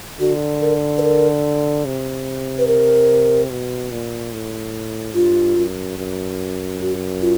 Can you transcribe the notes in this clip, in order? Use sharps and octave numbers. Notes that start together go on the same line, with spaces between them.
D3 F#4
A#4
B4
A#4
C3
B4
A#4
B2
A#2
A2
G2 F4
F#2
F#2
F#4
F4